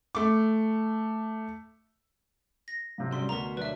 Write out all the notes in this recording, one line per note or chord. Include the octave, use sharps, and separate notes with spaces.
A3 D6
A#6
G#2 C3 F#3
C#3 G3 C6
D2 B3 F#4 A#4 A#5
B1 F#3 D4 B4 E5